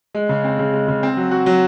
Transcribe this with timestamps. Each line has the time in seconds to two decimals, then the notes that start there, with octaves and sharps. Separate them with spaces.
0.15 G#3
0.29 C#3
0.44 C4
0.59 C#3
0.73 G#3
0.88 C#3
1.03 C4
1.17 F#3
1.31 F#4
1.46 F#3